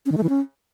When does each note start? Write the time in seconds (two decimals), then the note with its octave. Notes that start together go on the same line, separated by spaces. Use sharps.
0.06 C#4
0.12 D#3
0.17 A3
0.23 E3
0.29 C#4